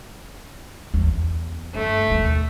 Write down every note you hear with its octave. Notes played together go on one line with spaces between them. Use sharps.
E2
G2 A3
E1 D#2